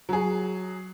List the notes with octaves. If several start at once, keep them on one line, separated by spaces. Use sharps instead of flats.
F#3 G#4